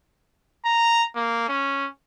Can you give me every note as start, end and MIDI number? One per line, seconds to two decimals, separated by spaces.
0.65 1.04 82
1.16 1.46 58
1.49 1.88 61